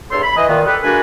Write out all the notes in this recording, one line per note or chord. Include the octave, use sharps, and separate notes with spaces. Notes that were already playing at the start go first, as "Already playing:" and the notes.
E2 G2 A4 C#5 C6
B5
E3 D#5
A#2 D#3 B3
G4 A4 B4
G#3 A#3 D4 F#4 B4 G#5